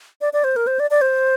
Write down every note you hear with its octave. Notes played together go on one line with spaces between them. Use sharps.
D5
D5
C5
A#4
C5
D5
D5
C5